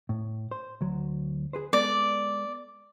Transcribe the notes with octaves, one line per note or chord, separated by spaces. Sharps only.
A2
C5
D2 F#3
G#4 B4 C5
G#3 B3 A4 D5